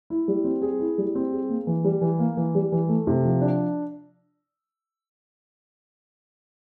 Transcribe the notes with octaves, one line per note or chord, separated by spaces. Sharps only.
E4
G3
C4
G#4
E4
G3
C4
G#4
A#3
E3
G3
E3
A#3
E3
G3
E3
A3
C3
F3
D4